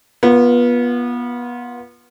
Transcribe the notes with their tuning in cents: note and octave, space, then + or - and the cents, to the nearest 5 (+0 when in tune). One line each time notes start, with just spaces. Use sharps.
B3 -25 F4 +0